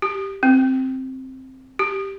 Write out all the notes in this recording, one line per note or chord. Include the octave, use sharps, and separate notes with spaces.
G4
C4
G4